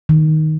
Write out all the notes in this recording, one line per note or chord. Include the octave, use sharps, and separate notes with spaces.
D#3